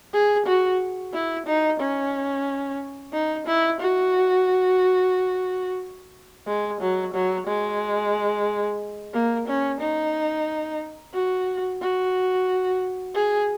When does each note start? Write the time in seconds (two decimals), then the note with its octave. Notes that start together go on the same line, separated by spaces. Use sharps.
0.13 G#4
0.46 F#4
1.13 E4
1.46 D#4
1.80 C#4
3.13 D#4
3.46 E4
3.80 F#4
6.47 G#3
6.81 F#3
7.14 F#3
7.47 G#3
9.14 A#3
9.48 C#4
9.81 D#4
11.14 F#4
11.81 F#4
13.15 G#4